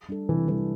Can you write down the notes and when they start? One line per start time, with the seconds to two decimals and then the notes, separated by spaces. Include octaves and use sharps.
0.09 G3 D4 A4
0.29 C3 E3
0.48 E3 G3 D4 A4